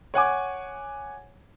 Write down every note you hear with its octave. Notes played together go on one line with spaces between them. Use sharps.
C#5 F#5 G#5 D6